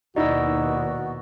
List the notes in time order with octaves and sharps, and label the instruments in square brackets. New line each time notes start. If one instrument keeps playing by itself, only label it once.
[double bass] D#2 B2 [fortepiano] D#4 E4 [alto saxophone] F#4 [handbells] D5 D#5 E6